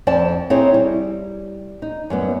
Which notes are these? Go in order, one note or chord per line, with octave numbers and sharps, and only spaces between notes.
F2 D5 G5 A5
C4 D#4 E4 G#4 C#5
G3
D#4
F#2 G3 B3